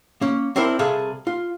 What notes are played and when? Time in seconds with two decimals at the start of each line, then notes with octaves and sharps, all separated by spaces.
0.21 A#3 C#4
0.56 C4 D4 E4 A#4 C5
0.79 C2 C3 G#4 A4 E5 F5
1.27 F4